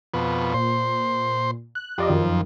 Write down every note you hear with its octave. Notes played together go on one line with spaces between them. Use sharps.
F2 B2
A#2 C5
F#6
F2 G4 D5 D#5
F#2 D#3 F3